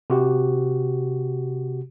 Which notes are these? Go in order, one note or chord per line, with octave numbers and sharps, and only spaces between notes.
C3 F#4 G4